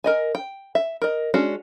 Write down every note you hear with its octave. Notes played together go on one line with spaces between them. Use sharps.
A#4 D#5 G#5
G5
E5
A#4 D#5
G#3 C#4 D4 F#4